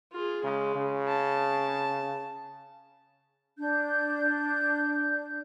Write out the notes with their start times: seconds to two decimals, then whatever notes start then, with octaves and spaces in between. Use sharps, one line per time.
0.12 F4 G#4
0.44 C#3 G#3
0.76 C#3
1.08 A5
3.59 D4 G6